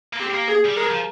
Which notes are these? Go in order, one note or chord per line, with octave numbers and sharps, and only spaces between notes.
A#3
C4 G4
A#3
G#4
G3
G#3 A#4
F3